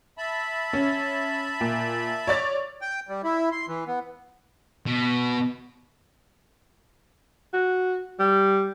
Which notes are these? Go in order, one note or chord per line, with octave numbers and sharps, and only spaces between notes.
E5 A5 B5
C#4
A#2
C#5 D5 A6
G5
G3
E4
C6
E3
B3
B2
F#4
G3